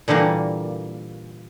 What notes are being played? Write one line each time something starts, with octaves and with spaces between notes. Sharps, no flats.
A#2 D3 E3 G3 A#3